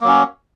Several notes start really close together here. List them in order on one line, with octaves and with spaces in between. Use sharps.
A#3 F#3 C#4